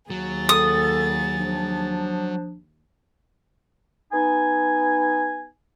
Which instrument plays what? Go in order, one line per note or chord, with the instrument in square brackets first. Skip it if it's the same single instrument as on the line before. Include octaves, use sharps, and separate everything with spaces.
[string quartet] D#2 G#4 A6 [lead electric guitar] F#3
[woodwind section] A4 [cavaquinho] D#6
[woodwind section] F3 D4
B3 D#4 G#5